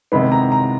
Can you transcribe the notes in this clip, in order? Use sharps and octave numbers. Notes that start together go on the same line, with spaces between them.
C3 D#3 G#3 B3 B5
A#5
A#5